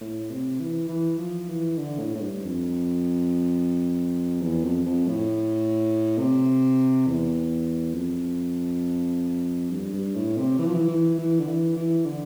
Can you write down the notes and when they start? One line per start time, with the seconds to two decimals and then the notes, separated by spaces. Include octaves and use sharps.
0.01 A2
0.31 C3
0.59 E3
0.88 E3
1.19 F3
1.48 E3
1.78 D3
1.99 A2
2.14 A2
2.21 G2
2.44 F2
4.42 E2
4.64 F2
4.86 F2
5.07 A2
6.18 C3
7.06 E2
7.94 F2
9.70 G2
9.93 G2
10.15 A2
10.38 C3
10.58 E3
10.66 F3
10.74 E3
10.88 E3
11.18 E3
11.40 D3
11.47 E3
11.76 E3
12.05 D3